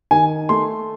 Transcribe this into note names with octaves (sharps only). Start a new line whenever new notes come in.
D#3 G#5
A3 C6